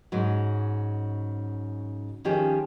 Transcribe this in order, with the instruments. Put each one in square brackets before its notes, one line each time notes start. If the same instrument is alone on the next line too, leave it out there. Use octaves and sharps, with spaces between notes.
[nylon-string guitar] G#2 C#3 F#3
D#3 F3 C#4 G4 G#4